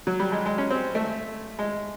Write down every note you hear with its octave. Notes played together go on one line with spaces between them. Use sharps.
F#3
G3
G#3
G#3
C#4
C4
A3
G#3